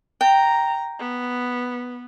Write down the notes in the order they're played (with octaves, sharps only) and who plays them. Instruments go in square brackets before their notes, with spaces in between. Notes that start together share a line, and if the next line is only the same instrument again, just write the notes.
[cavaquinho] G5 [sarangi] A#5
[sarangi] B3